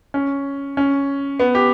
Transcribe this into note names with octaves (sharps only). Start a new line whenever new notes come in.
C#4
C#4
B3
G4